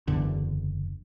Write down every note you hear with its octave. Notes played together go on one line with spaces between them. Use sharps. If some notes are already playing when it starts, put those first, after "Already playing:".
F#1 E2 D3